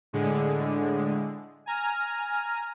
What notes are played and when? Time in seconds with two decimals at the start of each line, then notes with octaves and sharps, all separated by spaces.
0.13 A2 D3 G#3
1.66 G#5 A#5 F6